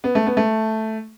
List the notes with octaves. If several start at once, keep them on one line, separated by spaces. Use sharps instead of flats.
B3
A3
B3
A3